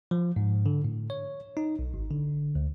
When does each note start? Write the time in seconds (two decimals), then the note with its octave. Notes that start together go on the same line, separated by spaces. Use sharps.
0.11 F3
0.36 G#2
0.66 D3
0.85 A2
1.10 C#5
1.57 D#4
1.79 B1
1.94 G#1
2.11 D3
2.55 D2